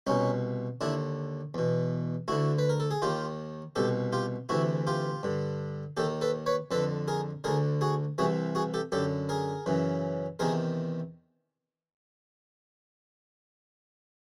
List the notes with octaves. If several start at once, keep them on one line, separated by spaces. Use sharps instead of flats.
C2 B2 C#4 D#4
D#2 D3 D4 E4
E2 B2
D2 D3 E4 F#4
B4
A#4
A4
G#4
D#2 D#3 F4 G4
C2 B2 G4 A4
F4 G4
D2 C3 E3 E4 F#4
F4 G4
G2 D3
D#2 D#3 G4 A4
A4 B4
B4 C#5
F2 D3 A4 B4
G#4 A#4
D2 D3 G#4 A#4
F#4 G#4
C2 C3 E3 F#4 G#4
F#4 G#4
G4 A4
F#2 D3 G4 A4
G#4 A#4
F#2 C#3 E3
E2 C3 D#3 G#4 A#4